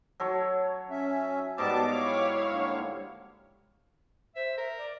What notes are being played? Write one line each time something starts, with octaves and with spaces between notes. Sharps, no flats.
F#3 A4 C#5
C#4 E5
G#2 F#3 G3 B3 A5 D6
E4 C#5 F5
D3 A#3
C5 E5
A#4
D5